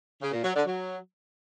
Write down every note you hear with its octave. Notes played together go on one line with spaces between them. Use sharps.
C#3
A#2
F#3
D3
F#3